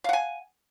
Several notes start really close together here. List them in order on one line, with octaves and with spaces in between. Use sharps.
F5 F#5 G#5